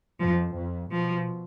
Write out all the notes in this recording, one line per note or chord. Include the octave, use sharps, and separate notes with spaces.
F2 F3
F2
B2 F3